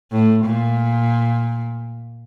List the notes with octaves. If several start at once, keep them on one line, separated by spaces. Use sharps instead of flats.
A2
A#2